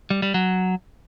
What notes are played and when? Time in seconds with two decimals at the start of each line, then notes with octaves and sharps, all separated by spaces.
0.10 G3
0.22 G3
0.34 F#3